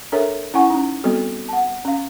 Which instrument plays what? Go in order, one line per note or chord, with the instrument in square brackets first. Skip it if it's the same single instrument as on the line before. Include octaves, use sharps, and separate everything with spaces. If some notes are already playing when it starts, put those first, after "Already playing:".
[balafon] D4 A4 A#4 C#5 E5
C#4 E4 F#5 G#5 C#6
C#4 D#4
G3 B3 C4 F#4 A4
F#5 A5
C#4 F5